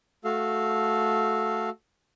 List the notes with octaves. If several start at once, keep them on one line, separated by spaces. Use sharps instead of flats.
A3 F#4 A4 F5